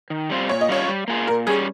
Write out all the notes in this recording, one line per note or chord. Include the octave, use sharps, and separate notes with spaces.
D#3
G3 C4 F4
A#2 C#5
D#5
G3 C#4 F4 C#5
G3
A#3 F4 G#4
A#2 A#4
G3 C#4 G#4